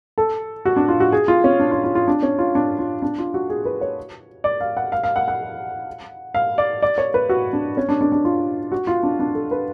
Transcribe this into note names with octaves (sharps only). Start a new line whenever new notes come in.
A4
F#4
D4
F4
F#4
G#4
F4
C#4
D4
F4
F4
F4
D4
C#4
F4
D4
F4
D4
F4
F#4
G#4
B4
C#5
D5
F5
F#5
F5
F5
F#5
F#5
F5
D5
D5
C#5
B4
F#4
D4
C#4
D4
D4
D4
F4
F#4
F4
D4
D4
A4
B4